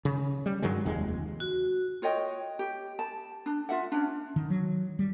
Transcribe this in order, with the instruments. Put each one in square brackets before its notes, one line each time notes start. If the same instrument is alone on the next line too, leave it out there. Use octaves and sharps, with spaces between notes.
[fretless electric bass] C#3
G3
G2 D#3 F#3 G#3
F1 D#2 G#3
[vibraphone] F#4
[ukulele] F4 C#5 D#5 G5
G4
A5
D4
F4 E5 F#5
C#4 D4
[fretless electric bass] D#3
F#3
G3